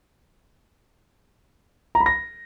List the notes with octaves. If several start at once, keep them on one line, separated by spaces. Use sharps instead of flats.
A#5
B5
A#6